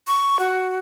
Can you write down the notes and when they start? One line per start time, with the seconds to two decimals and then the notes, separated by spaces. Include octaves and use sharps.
0.07 C#6
0.39 F#4